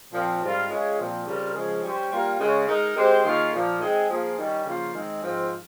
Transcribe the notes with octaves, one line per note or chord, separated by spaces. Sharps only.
A#2 F3 C4
G#2 G3 C4 F4 A#4
G#3 C#4 F4 G#4
A#2 F3 C4
C#3 G3 C4 F4 A#4
C#3 F3 G#3 C#4 G#4
G3 C#4 G4 C5
G3 A#3 F4 A#4
C#3 G#3 C#4
G#3 D#4 A#4
G#3 C4 G4 C5
D#3 A#3 C#4 F4 G#4
A#2 F3 A#3
G#3 C4 D#4 G#4
F3 A#3 F4 G#4
D#3 G3 C#4
C#3 F3 A#3 F4 C5
D#3 G#3 C4 D#4
G#2 F3 C4 F4